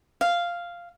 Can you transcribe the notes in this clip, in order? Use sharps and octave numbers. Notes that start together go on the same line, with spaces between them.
F5